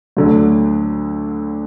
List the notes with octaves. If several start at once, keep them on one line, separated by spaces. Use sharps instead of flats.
D2 D3 F#3